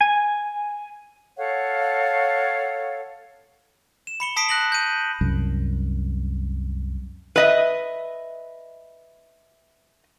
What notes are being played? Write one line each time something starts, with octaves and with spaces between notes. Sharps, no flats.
G#5
A4 C#5 F5 F#5
E7
B5 C#7 G7
A5 D#6 B6 C7 D7
F#6 A#6 F#7
G6 D#7
C2 F#2
B4 D#5 E5